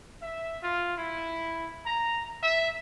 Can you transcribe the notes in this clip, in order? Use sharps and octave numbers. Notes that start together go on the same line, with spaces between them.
E5
F4
E4
A#5
E5